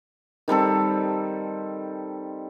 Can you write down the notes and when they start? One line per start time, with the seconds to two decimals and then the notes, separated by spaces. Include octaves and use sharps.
0.48 D#3 G3 C4 A4